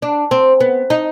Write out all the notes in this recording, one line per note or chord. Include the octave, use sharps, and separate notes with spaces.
D4
C4
B3
D#4